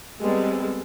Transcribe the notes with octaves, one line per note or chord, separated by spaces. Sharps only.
G3 G#3 B3 C4 A4